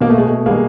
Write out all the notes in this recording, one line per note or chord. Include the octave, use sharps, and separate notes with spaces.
B2 A#3
A3
G#3
A3
G3 G#3 A#3 B3